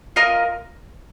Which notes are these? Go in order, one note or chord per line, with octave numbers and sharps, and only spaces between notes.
F4 A#4 D#5